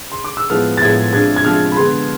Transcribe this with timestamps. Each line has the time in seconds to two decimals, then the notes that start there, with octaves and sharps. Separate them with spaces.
0.12 C6
0.24 D6
0.37 E6
0.50 A2 F3 G#3 B3 F6
0.77 A6
0.81 A2 F3 G#3 B3 G#6
1.13 C3 F3 G#3 D4 G#6
1.36 G#6
1.45 C3 F3 G#3 D4 F6
1.72 B5
1.76 D3 G#3 B3 C6